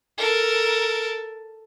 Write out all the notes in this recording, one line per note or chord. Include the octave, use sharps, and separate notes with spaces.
A4 A#4